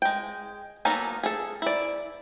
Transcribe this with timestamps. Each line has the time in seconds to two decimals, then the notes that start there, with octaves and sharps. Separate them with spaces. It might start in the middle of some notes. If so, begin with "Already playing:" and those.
0.02 G#3 G5
0.85 F#3 A#3 B3 D#4 A4
1.23 G#4 A4
1.62 E4 D5